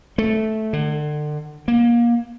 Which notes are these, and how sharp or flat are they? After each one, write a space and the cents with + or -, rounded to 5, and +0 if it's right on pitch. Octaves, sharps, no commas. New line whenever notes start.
A3 -10
D3 +35
A#3 +25